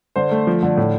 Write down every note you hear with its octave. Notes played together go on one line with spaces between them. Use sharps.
D3 C5
A3
F3
D3
A2